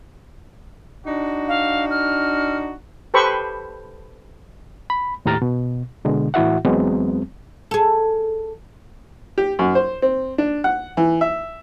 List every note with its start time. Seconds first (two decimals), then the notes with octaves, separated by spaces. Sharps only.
1.07 D4 D#4 F#4
1.48 F5
1.90 F6
3.14 G4 A4 B4 C5 B5 C#6
4.90 B5
5.25 D#2 A2 G4 A#5 F6 A6
5.42 B2
6.05 B2 D3 G#3
6.34 A2 E3 E4 F#4 E5 F#5
6.65 E2 F#3 G#3 B3 C4
7.71 G#4 A4
9.38 G4
9.59 F#2
9.75 C5
10.02 C4
10.38 D4
10.64 F#5
10.97 E3
11.21 E5